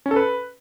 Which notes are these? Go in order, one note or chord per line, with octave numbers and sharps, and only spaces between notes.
C#4
A4
B4